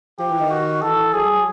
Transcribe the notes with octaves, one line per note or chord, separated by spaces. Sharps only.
F3 G4
E3
D#3
F#4
E3 A4
F#3 G#4
G3
F#3